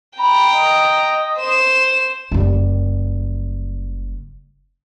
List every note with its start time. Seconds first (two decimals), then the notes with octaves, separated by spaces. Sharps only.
0.19 G5 A#5 B5
0.55 D#5
1.38 C5 E7
2.31 F#1 G3